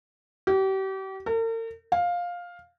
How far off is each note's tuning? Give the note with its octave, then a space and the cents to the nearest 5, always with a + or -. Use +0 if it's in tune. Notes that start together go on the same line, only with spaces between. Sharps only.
G4 -35
A#4 -45
F5 +10